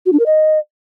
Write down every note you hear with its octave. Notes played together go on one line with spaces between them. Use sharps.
F#4
D4
A#4
D#5